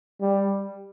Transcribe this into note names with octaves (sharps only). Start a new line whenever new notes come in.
G3